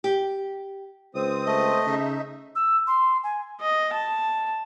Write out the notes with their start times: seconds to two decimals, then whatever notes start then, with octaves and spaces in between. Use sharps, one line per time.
0.04 G4
1.15 C#2 C4 D#6
1.46 A3 D#5
1.87 C#3 D#4 E5
2.56 E6
2.87 C6
3.23 G#5
3.61 D#5
3.94 A5